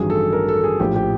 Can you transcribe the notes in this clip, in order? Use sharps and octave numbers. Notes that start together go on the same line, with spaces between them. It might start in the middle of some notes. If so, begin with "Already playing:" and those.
Already playing: A1 G2 D#3 F#3 G#4
A4
A#4
A4
G#4
A#1 A2 F3 G4
G4